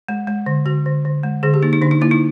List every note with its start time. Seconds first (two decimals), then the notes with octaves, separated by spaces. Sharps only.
0.08 G#3
0.27 G#3
0.46 D3
0.66 D3 F#4
0.86 D3
1.05 D3
1.23 G#3
1.43 D3 G#4
1.54 G4
1.63 A#3 D#4
1.73 D#4
1.82 D3 D4
1.91 D#4
2.01 A#3 E4
2.11 D#4